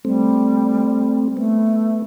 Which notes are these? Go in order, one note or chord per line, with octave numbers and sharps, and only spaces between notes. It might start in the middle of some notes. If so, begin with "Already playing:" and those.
G3 A3 C4
A3 B3